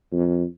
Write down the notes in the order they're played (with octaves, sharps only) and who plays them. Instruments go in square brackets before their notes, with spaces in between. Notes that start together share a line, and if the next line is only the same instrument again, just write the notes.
[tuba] F2